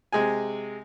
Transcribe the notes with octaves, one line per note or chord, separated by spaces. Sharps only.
C3 G#3 G#4 G#5